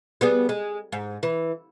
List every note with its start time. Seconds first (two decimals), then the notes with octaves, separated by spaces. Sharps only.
0.21 G3 B3 G#4
0.49 G#3
0.92 G#2
1.23 E3